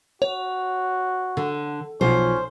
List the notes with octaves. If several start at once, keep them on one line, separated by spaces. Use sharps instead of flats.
F#4 C#5
D3
B1 F3 C#4 C5